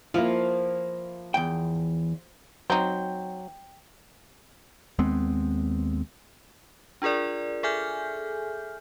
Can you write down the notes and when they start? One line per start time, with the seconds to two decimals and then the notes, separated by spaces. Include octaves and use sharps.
0.14 F3 A#3 E4 F5
1.34 E2 G5
2.70 F#3 C4 D#4 G5
4.99 D#2 G#3 B3 C4
7.02 D4 F4 G#4 A#4 D5
7.63 G#4 A4 E5 G#5 F6 G6